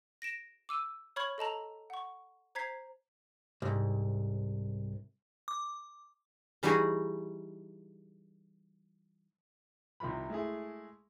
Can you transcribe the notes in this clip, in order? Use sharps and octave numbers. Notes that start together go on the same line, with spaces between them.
A#6 D7 E7
D6 E6 D#7
C#5 B5 C#6 F6 G#6 F#7
A4 D#5 A5 A#5
F#5 C#6
C5 A#5 G#6 B6 C7
C2 G#2
D6
E3 G3 D#4 F#4 G#4
C2 C3 D#3 F3 B5
G#3 A3 E4 G#4